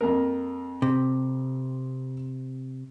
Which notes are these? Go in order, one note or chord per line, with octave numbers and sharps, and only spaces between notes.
F2 A#3 A#4
C3